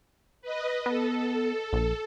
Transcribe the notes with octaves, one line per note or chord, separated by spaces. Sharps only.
B4 D#5
B3 A4
A#1